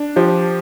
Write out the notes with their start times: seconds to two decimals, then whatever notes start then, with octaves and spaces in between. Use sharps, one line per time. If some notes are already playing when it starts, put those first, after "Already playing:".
Already playing: D4
0.16 F3 G4 C5